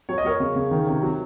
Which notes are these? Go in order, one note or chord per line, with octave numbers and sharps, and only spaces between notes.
F#3 C#5
D#5
F#3 A#4 C#5
C#3
C#3
D#3
C3
F#3